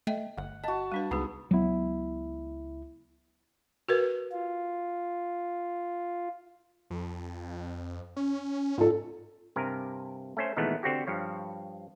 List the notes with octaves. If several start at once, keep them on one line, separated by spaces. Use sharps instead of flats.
A3 D#5 E5 G5
G1 F#5
F#4 D#5 A5
G3 D4 B4
C#2 B3 D#4 G#4
C#2 F#3 B3 E4
F#4 A#4 B4
F4
F2
C#4
G#2 F4 A4
G2 C3 A#4 G#5
A3 C#4 C5
A#2 D#3 E3 G#3 A3 B3
D3 C4 F#4 G4
G2 F3 C#5